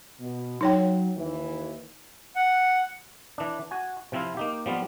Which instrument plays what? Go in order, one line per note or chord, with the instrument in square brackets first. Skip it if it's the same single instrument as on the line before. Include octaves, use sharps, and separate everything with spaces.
[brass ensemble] B2
[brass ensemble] F#3 [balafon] D#4 C#5 G5
[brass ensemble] D#2 E3
[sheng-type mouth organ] F#5
[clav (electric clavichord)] E3 D4
F#4 G#5
C3 F3 C4 E4 F4
A#3 D#4 G4
F3 G3 B3 F4